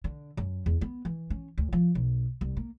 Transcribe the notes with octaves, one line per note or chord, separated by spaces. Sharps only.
D3
F#2
E2
B3
E3
C#4
D2
F3
B1
C2
A#3